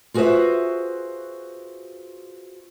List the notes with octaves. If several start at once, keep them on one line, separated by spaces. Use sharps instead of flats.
F4 F#4 G#4 B4 C5 E5